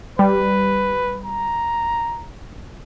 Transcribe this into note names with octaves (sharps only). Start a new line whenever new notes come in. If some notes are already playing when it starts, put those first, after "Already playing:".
G3 B4
A#5